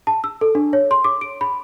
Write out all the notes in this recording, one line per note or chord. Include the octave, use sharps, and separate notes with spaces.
A5
E6
A4
D4
C#5
C6
D6
D7
B5